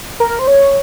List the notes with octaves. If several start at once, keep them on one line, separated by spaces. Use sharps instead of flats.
A#4
C5
C#5